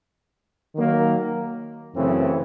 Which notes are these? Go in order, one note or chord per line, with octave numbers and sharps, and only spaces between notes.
D#3 F#3 A#3
F#2 C#3 E3 A3 C4